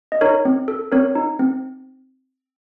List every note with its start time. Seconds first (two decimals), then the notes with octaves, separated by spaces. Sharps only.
0.12 D#5
0.21 D#4 A#4 C#5
0.45 C4
0.68 A4
0.92 C4 A#4 C#5
1.15 D#4
1.39 C4